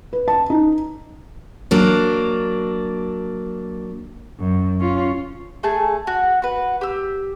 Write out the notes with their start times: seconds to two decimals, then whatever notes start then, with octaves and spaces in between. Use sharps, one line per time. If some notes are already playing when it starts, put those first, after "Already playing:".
0.13 B4
0.28 A5
0.50 D#4
1.71 F#3 A#3 D4
4.40 F#2
4.80 C#4 F4
5.63 A3 G#4 A5
6.07 F#4
6.42 F#4 B4
6.81 G4 E6